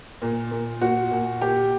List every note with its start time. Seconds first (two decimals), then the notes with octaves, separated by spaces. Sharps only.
0.22 A#2
0.51 A#2
0.81 A#2 F#4
1.11 A#2
1.41 A#2 G4